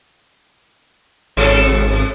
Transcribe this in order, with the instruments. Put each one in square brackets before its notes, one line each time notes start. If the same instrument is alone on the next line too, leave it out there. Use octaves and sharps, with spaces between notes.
[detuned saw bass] G#1 [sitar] C3 A4